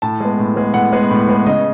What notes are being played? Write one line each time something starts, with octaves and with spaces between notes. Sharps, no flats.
A2 A5
G#3 B3
A2
G#3 B3
A2 F#5
G#3 B3
A2
G#3 B3
C#3 D#5